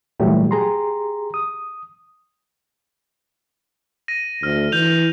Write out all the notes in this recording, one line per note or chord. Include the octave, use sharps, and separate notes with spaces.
A#2 E3 F#3 G3 A3 G4
G4 G#4 A#5 C6
D#6
A#6 D#7
D2 F6
E3 G6 F7